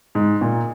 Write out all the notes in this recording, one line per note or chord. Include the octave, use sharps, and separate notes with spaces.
G#2
A#2